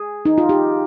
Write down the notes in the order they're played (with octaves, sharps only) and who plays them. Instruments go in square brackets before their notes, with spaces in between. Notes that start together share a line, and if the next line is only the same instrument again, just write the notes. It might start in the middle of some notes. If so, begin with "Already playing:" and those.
Already playing: [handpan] G#4
D#4
F4
G4